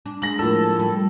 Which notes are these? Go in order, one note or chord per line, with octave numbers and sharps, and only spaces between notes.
D4
G#3 A#6 F#7
A2 F3 A#3 A4
G3